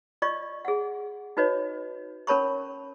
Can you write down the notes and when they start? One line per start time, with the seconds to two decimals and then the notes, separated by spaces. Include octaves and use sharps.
0.22 F4 D5 D#5 C#6
0.65 G#4 F#5
1.37 D#4 F#4 B4 C#5 D#5
2.27 C#4 A#4 C#5 A5 B5 C#6